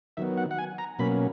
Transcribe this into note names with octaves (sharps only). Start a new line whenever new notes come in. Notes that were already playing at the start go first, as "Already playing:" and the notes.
D#3 F#3 B3 E5
F#5
F#5
G#5
A#5
B2 F#3 A#3 C#4 B5